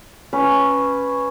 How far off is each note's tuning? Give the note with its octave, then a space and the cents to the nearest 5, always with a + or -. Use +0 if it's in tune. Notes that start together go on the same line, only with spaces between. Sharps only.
C#4 +0 B4 +0